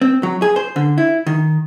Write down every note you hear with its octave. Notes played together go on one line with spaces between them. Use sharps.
C4
F#3
G#4
C5
D3
E4
D#3